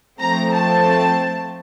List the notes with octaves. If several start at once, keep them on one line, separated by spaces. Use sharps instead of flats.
F3 A3 C4 A#5
A5